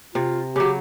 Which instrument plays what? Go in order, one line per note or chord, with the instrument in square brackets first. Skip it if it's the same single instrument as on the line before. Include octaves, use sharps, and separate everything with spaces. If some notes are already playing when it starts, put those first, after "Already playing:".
[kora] C3 [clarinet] F4
[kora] C#3 F#3 [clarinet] G4